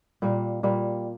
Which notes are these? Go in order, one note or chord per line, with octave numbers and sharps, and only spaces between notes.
A#2 G3 A#3
A#2 G3 A#3